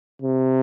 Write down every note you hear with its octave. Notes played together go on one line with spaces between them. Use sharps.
C3